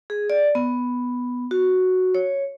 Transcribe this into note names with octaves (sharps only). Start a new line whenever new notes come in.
G#4
D5
B3
F#4
C#5